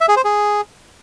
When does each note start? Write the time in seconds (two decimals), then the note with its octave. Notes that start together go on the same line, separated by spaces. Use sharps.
0.01 E5
0.08 G#4
0.16 C5
0.24 G#4